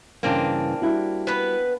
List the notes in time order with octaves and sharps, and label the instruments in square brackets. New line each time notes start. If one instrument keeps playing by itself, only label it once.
[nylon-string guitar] G2 C#3 E3 [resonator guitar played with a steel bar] A#3 C4 D4
[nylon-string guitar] G3 E4 F#4
[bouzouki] B3 B4